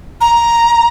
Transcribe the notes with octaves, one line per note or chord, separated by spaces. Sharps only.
A#5